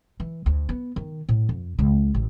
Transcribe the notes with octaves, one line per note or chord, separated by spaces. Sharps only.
E3
D2
B3
D#3
A2
F2
C#2
A1